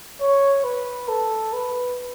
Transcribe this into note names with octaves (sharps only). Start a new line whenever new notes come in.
C#5
B4
A4
B4